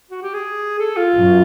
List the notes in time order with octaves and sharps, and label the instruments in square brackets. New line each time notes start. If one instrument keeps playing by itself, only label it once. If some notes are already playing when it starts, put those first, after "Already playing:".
[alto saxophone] F#4
G4
G#4
A4
F4
[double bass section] F#2